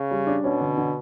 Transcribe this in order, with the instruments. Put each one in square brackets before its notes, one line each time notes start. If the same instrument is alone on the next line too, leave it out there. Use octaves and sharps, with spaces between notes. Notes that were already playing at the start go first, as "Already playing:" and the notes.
Already playing: [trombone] C#3
[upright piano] G3
D4
[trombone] B2 [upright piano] C#4
[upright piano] D3
D3